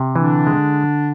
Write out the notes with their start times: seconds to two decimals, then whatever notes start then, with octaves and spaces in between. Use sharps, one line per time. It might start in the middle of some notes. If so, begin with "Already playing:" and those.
Already playing: C3
0.16 D3 E3 D4
0.47 G#3